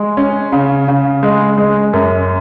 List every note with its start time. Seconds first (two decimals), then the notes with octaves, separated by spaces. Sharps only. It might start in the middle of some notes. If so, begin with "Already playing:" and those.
Already playing: G#3
0.17 C#4
0.52 C#3
0.88 C#3
1.23 G#3
1.58 G#3
1.93 F#2